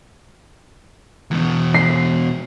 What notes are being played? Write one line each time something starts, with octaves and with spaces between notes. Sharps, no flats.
E2 B2
C7